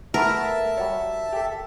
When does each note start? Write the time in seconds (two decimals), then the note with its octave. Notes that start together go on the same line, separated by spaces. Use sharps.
0.14 A3 B3 A#4 E5 A5
0.77 G3 F#4 C#5
1.33 G4 A4